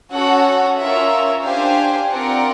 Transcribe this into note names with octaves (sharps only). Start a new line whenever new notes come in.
C#4 F#4 A4 C#5 F#5
C#4 F4 A#4 C#5 E5
D4 G4 C5 F5 G#5
C4 F4 A#4 D5 F#5